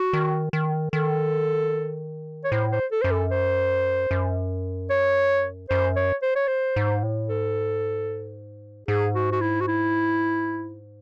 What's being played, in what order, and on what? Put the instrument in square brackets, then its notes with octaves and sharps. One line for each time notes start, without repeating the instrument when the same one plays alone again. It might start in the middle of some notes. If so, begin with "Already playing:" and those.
Already playing: [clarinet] F#4
[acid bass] D#3
D#3
[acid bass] D#3 [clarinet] A4
[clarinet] C#5
[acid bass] A2 [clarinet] C5
[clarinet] C5
A4
[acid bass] F#2 [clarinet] C5
[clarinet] A4
C5
[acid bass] F#2
[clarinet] C#5
[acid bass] F#2 [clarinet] C5
[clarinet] C#5
C5
C#5
C5
[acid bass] G#2
A2
[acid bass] G#2 [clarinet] A4
[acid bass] G#2 [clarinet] G#4
[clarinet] F#4
F#4
E4
F#4
E4